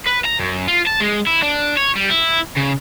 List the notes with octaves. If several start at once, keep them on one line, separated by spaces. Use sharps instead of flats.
B4
A#5
F#2
F4
A5
G#3
E4
D4
C#5
G3
E4
C#3